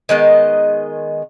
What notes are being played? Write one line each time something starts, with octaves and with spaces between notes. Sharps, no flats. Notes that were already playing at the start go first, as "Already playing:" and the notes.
D#3 G#3 B3 D#5